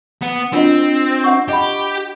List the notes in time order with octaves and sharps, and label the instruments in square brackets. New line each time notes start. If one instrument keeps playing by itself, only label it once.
[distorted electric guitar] B3
[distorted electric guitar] C4 [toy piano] D4 F4 D#5
[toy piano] E5 F#5 C#6
[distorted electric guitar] G4 [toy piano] D#5 B5